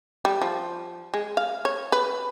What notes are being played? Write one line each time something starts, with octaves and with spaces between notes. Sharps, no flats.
G3
F3
G#3
F5
C#5
B4